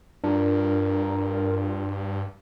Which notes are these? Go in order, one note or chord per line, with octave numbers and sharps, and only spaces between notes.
G2 D4 F4 A#4